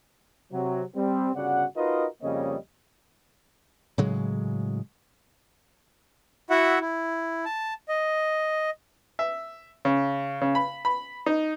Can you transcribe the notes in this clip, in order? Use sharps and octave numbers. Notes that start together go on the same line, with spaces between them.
C3 F#3
G3 C4
G1 C#3 F#4 D5 F#5
D#4 F4 F#4 A#4 B4 D#5
F2 C#3 G3 A#3 C#5 D#5
A2 C#3 F#3 G#3
E4 F#4 E5 F#5
E4
A5
D#5
E5
C#3
C#3
B5
B5
D#4